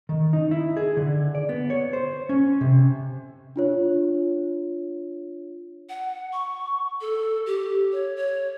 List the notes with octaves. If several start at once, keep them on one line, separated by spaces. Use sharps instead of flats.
D#3
D#4
E4
G#4
D3
D5
B3
C#5
C5
C#4
C3
D4 F4 C#5
F#5
C#6
A4
G4
C#5
C#5